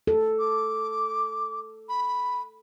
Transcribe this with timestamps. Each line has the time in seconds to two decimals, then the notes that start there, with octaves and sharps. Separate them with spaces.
0.07 A4
0.39 D6
1.89 B5